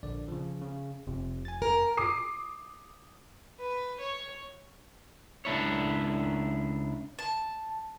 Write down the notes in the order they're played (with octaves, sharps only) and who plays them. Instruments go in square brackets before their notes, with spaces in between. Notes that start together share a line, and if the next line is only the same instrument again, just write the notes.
[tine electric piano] A#1 D3 D5
C#3 F3
C#3
[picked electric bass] F1 [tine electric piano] C3
[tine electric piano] G#5 A6
[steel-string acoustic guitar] A#4
[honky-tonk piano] D6 D#6 C7
[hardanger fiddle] B4
C#5
[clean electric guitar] C#2 D4 E4 C#5
[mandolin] A5